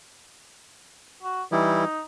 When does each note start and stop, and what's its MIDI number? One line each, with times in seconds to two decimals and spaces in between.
1.23 1.43 66
1.52 1.84 52
1.52 1.84 55
1.52 2.02 63
1.52 1.84 64